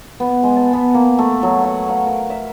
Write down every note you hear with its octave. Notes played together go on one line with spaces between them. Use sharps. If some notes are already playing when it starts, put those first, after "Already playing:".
B3
G#3
A5
B3
A#3
A3
F#3
F#5
F5
A#4
E5